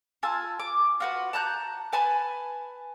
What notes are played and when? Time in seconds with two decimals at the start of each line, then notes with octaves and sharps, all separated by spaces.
0.23 F4 G#5 A5 E6
0.60 D6
1.00 F4 F#4 B4
1.33 A5 A#5 F#6 G6
1.93 B4 G#5 A5 B5